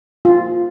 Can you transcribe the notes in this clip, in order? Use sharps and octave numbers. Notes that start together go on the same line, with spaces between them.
F4